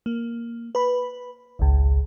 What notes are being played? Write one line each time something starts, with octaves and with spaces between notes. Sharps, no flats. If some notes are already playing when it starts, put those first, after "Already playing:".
A#3
B4 B5
G#1 C#2